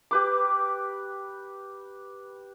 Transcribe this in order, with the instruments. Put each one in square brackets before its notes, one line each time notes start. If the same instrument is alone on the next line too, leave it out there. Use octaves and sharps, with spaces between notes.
[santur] G4 B4 D6